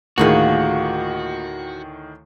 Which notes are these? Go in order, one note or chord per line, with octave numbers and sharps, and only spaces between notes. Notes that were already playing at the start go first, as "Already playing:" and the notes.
D2 A2 D#3 A#3 F4 F#4 G#4